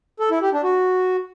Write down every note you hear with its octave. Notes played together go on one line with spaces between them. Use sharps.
A4
E4
G4
D4
F#4